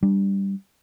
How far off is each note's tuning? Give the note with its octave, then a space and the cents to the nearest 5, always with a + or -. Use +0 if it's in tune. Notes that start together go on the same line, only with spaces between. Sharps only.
G3 +0 D4 +0